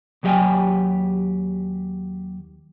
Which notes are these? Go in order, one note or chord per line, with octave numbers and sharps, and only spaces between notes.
D#2 F#3 G4 D#5 G5 G#5